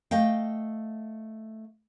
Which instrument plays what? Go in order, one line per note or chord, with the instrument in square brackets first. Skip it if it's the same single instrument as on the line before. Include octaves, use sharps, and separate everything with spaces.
[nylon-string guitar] A3 D#5 F5 G5